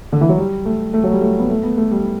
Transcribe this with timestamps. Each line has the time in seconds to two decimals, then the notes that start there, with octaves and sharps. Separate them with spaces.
0.12 D3
0.21 E3
0.29 F#3
0.38 G3
0.65 A3
0.94 A3
1.04 F#3
1.12 G3
1.21 A3
1.39 B3
1.49 A3
1.63 B3
1.77 A3
1.91 G3